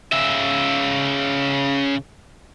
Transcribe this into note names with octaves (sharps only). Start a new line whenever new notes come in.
C#3 E5